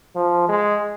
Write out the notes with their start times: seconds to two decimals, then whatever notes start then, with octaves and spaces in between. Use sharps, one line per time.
0.16 F3
0.49 G#3